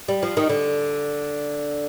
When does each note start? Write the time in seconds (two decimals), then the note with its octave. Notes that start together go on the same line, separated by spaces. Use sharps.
0.08 G3
0.23 F3
0.37 D#3
0.49 D3